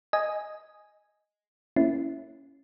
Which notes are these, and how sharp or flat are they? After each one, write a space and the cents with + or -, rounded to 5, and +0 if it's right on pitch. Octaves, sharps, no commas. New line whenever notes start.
D#5 +0 G#5 +0
A#3 +0 C#4 +0 E4 +0